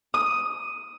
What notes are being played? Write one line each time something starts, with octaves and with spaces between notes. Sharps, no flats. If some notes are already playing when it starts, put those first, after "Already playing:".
D#6